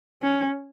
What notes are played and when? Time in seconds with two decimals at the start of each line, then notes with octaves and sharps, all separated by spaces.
0.23 C#4